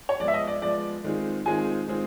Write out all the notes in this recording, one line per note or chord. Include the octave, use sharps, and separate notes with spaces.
C#5
F3 G#3 B3 D5
E5
D#5
D5
F3 G#3 B3 D5
D#3 G#3 C4 F4 G#4
D#3 G#3 C4 F4 G#4 G#5
D#3 G#3 C4 F4 G#4